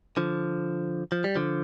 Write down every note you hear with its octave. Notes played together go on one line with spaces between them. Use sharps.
D3 F3
F3
G3
D3 F3